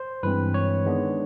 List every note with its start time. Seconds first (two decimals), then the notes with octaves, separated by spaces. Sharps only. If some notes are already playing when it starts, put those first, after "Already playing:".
Already playing: C5
0.23 G2 E3 G#3 C4 B4
0.54 C#5
0.85 D#3 G#3 B3 D4